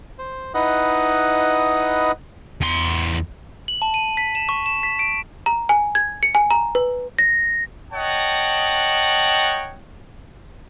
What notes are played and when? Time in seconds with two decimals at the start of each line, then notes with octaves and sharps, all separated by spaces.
0.19 C5
0.54 D#4 E4 B4 D#5 F#5 D#6
2.61 E2 C6
3.68 F#7
3.82 A5
3.94 D#7
4.17 B6
4.35 E7
4.49 C#6
4.66 E7
4.83 B6
4.99 D7
5.46 A#5
5.69 G#5
5.95 G#6
6.23 C#7
6.35 G#5
6.51 A#5
6.75 B4
7.19 A#6
7.92 C#5 D#5 F#5 G5 A5